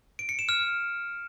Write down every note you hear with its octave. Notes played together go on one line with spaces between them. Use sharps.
D7
C#7
E7
F6